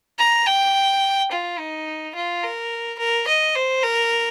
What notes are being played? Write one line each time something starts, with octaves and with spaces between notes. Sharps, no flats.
A#5
G5
F4
D#4
F4
A#4
A#4
D#5
C5
A#4